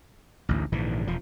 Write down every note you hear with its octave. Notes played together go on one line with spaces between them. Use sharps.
A1 D2 G#2
A#1 G#2 D3 E3
E1 F3